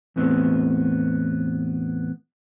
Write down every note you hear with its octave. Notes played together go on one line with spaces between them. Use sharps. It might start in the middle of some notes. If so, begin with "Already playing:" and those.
E2 A2 B3 C4